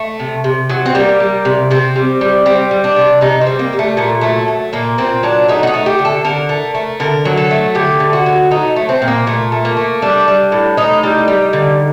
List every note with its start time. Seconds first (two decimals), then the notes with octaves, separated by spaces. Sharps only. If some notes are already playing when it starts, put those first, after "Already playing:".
Already playing: A3
0.20 C3
0.44 C3
0.70 F#3
0.86 C4
0.95 G3 A#3
1.20 G3
1.45 C3
1.71 C3 C4
1.96 G3
2.21 G3
2.46 G3 C4
2.71 G3
2.84 D4
2.96 C3
3.21 C3 D#4
3.41 C4
3.47 G3
3.59 A#3
3.73 G3
3.79 A3
3.97 A#2 A3
4.21 F#3 A3
4.48 A3
4.73 A#2 A#3
4.98 A#2 C4
5.23 F#3 D4
5.48 A3 D#4
5.63 F#4
5.67 D#4
5.74 A3
5.86 G4
5.99 D3
6.05 A4
6.25 D3 A#4
6.49 A3
6.75 A3
7.00 D3 A#4
7.25 F#3
7.37 A4
7.51 A3
7.75 D3 G4
8.00 D3
8.13 F#4
8.26 F#3
8.51 A3 D#4
8.76 A3
8.89 C4
9.02 A#2
9.08 A#3
9.27 A#2 A3
9.52 A3
9.65 A#3
9.77 A3
10.02 G3 D4
10.28 G3
10.52 A2
10.77 A2 D#4
11.03 G3
11.28 G3
11.53 D3